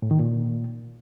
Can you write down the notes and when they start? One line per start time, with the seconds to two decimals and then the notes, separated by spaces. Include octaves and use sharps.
0.02 A2
0.11 D#3
0.19 A#2